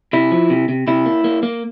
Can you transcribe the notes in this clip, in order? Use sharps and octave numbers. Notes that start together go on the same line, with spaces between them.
C3 E4
F3
C3
C3
C3 E4
A#3
A#3
A#3